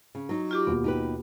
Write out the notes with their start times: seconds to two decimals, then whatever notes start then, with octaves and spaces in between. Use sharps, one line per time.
0.15 C#3
0.29 F#3 D#4
0.51 F4 G4 D6
0.67 D#2 B2 B3
0.84 D#4 G4 B4